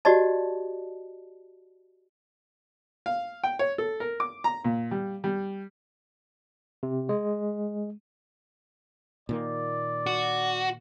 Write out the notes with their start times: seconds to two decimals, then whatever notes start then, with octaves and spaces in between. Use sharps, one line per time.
0.05 F#4 G4 D5 D#5 A5
3.06 F5
3.43 G5
3.59 C#5
3.78 A4
4.00 A#4
4.20 D6
4.44 A#5
4.65 A#2
4.91 G3
5.24 G3
6.83 C3
7.09 G#3
9.29 A#2 D#3 A#3 D5
10.06 F#4